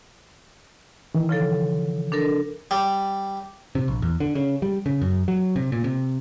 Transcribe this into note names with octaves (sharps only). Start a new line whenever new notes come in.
D#3 E3
C#3 F3 A4
D4 A4 A#4
G3
C3
A#1
E2
D3
C#3
G3
C#3
F#2
F#3
C3
A#2
C3